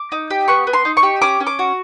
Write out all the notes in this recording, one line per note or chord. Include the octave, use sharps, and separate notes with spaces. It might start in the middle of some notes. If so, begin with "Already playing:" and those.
Already playing: D6
D#4
G4
B3 C#6
B3
C6
D#4
C#6
G4
C#4 D6
C#4
D6
F#4